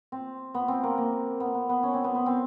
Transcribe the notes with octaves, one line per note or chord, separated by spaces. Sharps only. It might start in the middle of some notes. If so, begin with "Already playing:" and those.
C4
B3
C4
A#3
A#3
B3
B3
B3
C#4
C4
B3
B3
C4